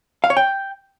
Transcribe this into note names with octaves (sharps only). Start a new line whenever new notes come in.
F5
C#5
G5